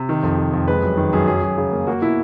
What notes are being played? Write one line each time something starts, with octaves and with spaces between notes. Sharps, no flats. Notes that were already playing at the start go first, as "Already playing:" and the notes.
Already playing: C3
D#3
F2
C3
F2
G#3 B4
F#2
D#3
F#2 G#4
F#3 G#4
F#2
C#3
A#3
A#3 F#4
B2 E4